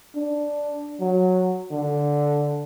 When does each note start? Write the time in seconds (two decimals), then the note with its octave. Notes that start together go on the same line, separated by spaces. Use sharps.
0.15 D4
1.00 F#3
1.72 D3